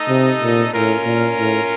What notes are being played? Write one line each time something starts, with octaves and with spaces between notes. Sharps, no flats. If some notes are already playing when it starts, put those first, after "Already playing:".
Already playing: A3 D#4 A4 D#5
C3
A#2
A2 C#4 F4 A#4
A#2
A2